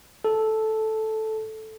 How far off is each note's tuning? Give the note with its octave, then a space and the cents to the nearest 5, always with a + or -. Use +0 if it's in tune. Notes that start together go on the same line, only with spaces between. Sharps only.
A4 -5